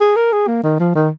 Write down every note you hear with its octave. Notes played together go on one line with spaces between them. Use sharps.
G#4
A#4
G#4
A#3
D#3
F3
D#3